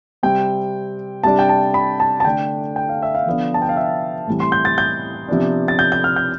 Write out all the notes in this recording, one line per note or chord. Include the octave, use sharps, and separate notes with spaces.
C3 G3 C4 G5
C3 G3 D4 A5
G5
A5
B5
A5
A5
D3 A3 D4 G5
G5
F5
E5
F5
D3 F3 B3 D4
A5
G5
F5
E5
A2 E3 G3 C4
C6
G6
A6
G6
C3 F3 B3 D4
A6
G6
G6
F6
G6